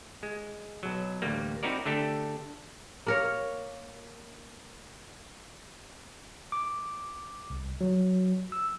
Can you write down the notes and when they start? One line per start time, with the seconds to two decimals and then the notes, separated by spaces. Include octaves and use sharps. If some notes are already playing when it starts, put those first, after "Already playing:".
0.23 G#3
0.83 B1 F#3
1.22 A1 D2 G3 A#3
1.63 C4 D#4 E4 F#4 A#4 D5
1.86 D3 A3 D4 G4 A4
3.07 A#3 A#4 C#5
6.52 D6
7.50 C2
7.81 F#3
8.52 E6